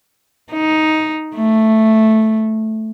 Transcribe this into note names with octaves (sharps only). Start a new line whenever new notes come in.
D#4
A3